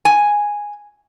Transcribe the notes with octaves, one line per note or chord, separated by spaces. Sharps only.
G#5